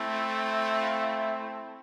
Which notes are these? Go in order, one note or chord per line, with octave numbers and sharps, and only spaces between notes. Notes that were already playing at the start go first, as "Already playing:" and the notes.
Already playing: A3 C4 E4
F5
E5